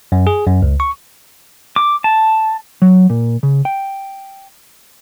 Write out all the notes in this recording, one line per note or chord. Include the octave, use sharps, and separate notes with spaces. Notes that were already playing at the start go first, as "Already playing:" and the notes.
F#2
G#4
F#2
C#2
C#6
D6
A5
F#3
A#2
C#3
G5